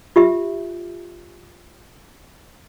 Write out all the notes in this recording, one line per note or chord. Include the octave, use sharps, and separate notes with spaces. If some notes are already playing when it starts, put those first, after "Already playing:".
F4 G4 E5